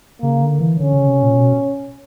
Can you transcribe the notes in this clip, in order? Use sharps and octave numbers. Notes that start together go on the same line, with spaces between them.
C#3 A#3
D3
E3
D3 C#4
C#3
C3
A#2
B2